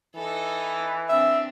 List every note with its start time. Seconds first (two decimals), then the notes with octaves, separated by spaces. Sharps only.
0.16 E3 D#4 A4
1.09 C4 D4 E5